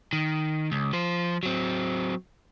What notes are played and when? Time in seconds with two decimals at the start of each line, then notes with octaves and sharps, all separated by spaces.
0.13 D#3
0.72 C#2
0.93 F3 C5
1.43 F#3 C4